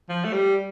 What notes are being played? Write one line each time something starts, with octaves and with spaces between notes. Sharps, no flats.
F3
A3
G3